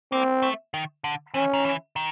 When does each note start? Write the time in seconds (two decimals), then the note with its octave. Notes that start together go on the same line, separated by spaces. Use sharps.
0.12 A#3 C4
0.43 A3
0.74 D#3
1.04 D3
1.34 E3 C#4
1.54 D#3
1.65 E3
1.96 D#3